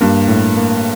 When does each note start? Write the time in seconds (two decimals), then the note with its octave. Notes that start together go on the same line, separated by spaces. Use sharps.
0.01 G2 A#3
0.28 A2
0.57 A#3